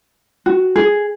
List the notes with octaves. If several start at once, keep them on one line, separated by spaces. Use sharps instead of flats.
F#4
G#4